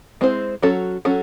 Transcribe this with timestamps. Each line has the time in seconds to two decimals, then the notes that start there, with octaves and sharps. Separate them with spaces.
0.21 G#3 C4 E4 C5
0.62 F#3 C#4 F#4 A4
1.05 F#3 C#4 F#4 A4